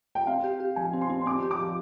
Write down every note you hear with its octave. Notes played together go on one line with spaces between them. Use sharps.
G5
C4 F5
G4
G4
F3 G#5
C4
C6
C4
C6
C4 D6
G4
D6
F3